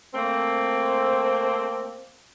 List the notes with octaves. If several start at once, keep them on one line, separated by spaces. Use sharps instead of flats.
A3 A#3 C4